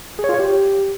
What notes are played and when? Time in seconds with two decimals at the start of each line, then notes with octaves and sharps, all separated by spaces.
0.19 G#4
0.24 C#5
0.29 F4
0.34 C#5
0.39 G4